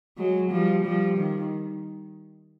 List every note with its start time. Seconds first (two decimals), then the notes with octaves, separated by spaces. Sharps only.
0.18 F#3 G#3
0.51 F3 G3
0.85 F3 G3
1.18 D#3